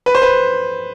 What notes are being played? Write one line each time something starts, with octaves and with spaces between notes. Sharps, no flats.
B4
C5
B4